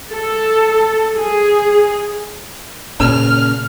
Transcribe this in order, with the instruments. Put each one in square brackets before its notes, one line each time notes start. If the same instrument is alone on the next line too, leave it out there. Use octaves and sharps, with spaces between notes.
[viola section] A4
G#4
[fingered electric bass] A#2 C#3 [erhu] F6